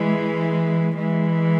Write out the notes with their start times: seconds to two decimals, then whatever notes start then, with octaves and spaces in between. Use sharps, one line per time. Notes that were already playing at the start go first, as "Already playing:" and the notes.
Already playing: E3 G#3
0.96 E3 G#3